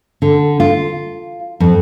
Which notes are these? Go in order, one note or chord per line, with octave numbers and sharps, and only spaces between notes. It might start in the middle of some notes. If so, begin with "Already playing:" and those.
D3
F4
F2